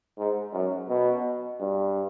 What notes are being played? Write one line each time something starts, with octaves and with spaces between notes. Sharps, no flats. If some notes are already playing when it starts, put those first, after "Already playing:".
G#2
F#2
B2
G2